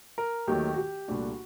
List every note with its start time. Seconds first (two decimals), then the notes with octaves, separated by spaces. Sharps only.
0.18 A#4
0.47 D#2 D#3 F#3 A3 G4
0.74 F#4
0.78 G4
1.08 C2 A#2 A3 D4 F#4